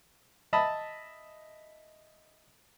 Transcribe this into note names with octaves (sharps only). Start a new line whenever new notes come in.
D#5 E5 A5 B5 D#6